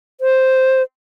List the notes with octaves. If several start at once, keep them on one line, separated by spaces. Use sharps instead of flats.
C5